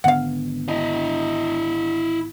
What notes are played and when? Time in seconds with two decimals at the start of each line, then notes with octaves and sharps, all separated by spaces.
0.04 G#1 D3 B3 F5 F#5
0.68 E4 D#5